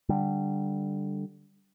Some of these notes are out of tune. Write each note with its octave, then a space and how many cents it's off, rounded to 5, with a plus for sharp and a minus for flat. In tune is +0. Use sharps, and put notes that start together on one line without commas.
D3 +0 G3 +0